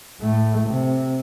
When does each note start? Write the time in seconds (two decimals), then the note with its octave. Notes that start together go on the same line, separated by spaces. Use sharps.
0.21 A2 A3
0.69 C3